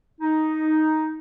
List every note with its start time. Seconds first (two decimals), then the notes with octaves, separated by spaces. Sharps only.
0.21 D#4